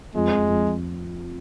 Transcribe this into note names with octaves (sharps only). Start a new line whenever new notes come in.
F2 G#3
F2
F2